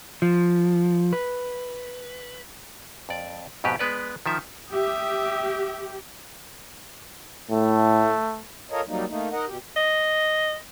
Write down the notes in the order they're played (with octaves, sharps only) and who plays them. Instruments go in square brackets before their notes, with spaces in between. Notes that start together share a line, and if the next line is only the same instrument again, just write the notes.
[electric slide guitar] F3
B4
[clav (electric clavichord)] F2 D5
F2 G#2 B2 G4 B4
G#3 B3 B4 D5
D#3 F3 E5
[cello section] G4 [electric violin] E5 D#6
[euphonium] A2 [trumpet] A3
[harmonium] F4 A4 A#4 C#5 D#5
F#3 G3 A#3 D#4
A3 A#3 D#4
D#4 A#4 D#5 F#5
B2 G4
[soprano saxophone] D#5